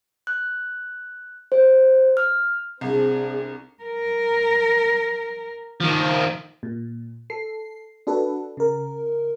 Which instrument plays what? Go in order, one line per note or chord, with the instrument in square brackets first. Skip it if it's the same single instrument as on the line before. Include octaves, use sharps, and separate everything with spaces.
[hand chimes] F#6
C5
F6
[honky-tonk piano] C2 [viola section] C4 D4 G#4
[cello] A#4
[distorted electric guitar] D#3 F3
[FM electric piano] A#2
A4 C7
D4 F#4 A4 B4
C#3 A#4